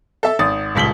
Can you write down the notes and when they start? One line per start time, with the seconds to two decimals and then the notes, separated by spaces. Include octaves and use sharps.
0.23 A4 E5 A5
0.39 G#1 D#6 A6
0.75 D#1 C#2 B6 F#7 G7